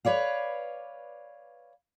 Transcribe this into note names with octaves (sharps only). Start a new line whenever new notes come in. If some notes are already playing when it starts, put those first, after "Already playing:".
B4 C#5 D5 F5